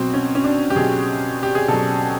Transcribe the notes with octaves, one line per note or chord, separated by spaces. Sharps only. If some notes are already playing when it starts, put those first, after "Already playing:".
Already playing: B2 F#3 C4
C#4
C#4
D4
G4
B2 F#3 G#4
G4
G#4
B2 F#3 A4